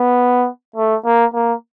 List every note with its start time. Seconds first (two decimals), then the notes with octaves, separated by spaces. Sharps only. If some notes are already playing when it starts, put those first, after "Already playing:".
Already playing: B3
0.76 A3
1.05 A#3
1.34 A#3